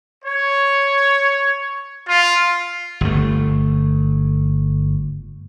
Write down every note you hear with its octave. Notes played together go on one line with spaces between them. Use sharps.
C#5
F4
G1 A3